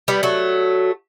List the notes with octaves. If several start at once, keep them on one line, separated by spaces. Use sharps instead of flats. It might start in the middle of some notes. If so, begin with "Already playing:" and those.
G3 B3
F#3 A3